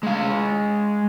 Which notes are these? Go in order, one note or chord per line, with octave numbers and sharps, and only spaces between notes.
G#3 F5